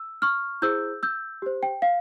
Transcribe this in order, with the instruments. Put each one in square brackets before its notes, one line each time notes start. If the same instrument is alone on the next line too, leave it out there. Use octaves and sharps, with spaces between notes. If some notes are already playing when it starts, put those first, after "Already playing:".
Already playing: [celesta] E6
C#6 F6
E4 G#4 C5 E6 G6
E6 G6
G4 C5
G5
F5